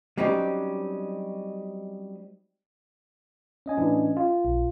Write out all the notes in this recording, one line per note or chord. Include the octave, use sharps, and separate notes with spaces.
F#3 G3 C4 C#4 D#4 G4
C#4 D#5 G#5
A2 E3 D4
F4
A#1